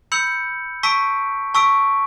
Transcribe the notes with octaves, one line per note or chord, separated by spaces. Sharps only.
B5 E6 G6 C#7 F#7
A5 C#6 E6 B6 D7
A5 C#6 E6 B6 D7